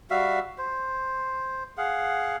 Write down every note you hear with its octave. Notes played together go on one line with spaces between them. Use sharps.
G3 F#4 E5 F5
C5
G#4 F5 F#5